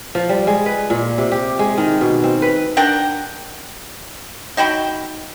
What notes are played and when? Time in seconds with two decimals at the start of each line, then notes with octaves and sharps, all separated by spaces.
0.15 F3
0.29 G3
0.47 G#3
0.66 B4
0.90 A#2
1.18 C3
1.32 G4
1.59 G#3
1.78 D#3
2.01 B2
2.24 C4
2.42 B4
2.77 D4 A#4 F#5 G5
4.57 D#4 F#4 G5 B5